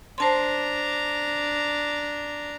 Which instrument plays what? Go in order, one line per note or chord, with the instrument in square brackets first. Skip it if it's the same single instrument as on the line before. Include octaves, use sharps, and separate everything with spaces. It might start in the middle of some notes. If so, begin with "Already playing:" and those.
[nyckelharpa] D4 A#5 [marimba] C5 A5 C6